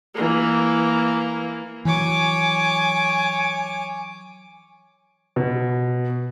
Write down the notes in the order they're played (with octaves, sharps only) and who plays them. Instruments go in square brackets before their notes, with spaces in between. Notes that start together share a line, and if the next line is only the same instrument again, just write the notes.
[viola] E3 A#3
[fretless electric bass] E3 F#3 [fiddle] C#5 D6 [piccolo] G#5
[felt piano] B2